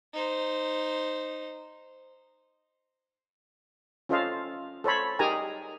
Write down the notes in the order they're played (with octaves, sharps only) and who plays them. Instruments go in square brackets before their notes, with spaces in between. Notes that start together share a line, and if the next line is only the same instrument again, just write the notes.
[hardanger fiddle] D#4 C5
[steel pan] C#4 F4 A4 C5 D#5 F5
A4 C5 C#5 B5
D#4 G4 G#4 A#4 G#5 A#5